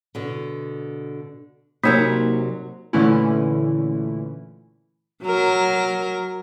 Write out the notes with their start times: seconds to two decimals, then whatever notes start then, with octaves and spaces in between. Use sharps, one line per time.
0.15 B2 D3
1.84 C3 F#3 A#3 D#4 A#4
2.93 A#2 D3 E3 A3 C#4 E4
5.23 F#3 A#4